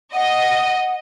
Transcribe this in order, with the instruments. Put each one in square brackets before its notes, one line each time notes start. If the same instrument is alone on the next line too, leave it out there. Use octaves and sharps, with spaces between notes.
[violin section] D#5 [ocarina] F#5